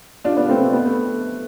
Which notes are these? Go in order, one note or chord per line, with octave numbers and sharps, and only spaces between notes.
D4 F4
B3 D4
A3 C4
A3
B3
A3